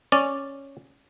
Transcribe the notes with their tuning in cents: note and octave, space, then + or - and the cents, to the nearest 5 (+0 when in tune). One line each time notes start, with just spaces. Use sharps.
C#4 -5 D5 +0